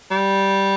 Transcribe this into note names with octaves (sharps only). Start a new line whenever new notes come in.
G3